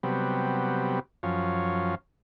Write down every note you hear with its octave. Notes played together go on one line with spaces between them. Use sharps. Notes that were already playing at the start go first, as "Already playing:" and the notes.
C3 F#3 G3 B3
F#2 F3 C#4